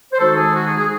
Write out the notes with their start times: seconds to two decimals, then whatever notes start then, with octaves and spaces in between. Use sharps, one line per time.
0.13 C5
0.19 D#3 G#3 D#4 F#4 A4
0.37 G#4
0.55 F#4
0.67 G#4
0.78 G#4